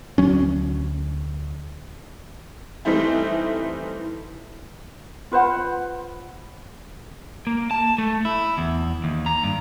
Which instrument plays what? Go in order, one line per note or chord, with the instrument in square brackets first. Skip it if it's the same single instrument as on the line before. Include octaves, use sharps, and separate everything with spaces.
[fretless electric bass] D2 F#3 C#4
[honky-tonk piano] E3 G3 A3 C4 D#4 E4
[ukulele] F4 B4 C5 F#5
[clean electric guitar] A#3
A5
A3
E4
E2
D#2
A#5
G2